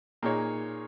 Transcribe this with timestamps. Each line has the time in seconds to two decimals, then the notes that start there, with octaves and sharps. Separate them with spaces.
0.23 A#2 A#3 D#4 G#4 C#5